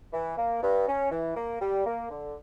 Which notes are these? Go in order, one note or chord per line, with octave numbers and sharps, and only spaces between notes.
E3
A#3
G2
C#4
E3
A#3
G3
A#3
D3